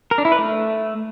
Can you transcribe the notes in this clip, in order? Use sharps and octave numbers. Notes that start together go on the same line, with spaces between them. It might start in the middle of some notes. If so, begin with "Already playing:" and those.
A#4
D4
E4
B4
A3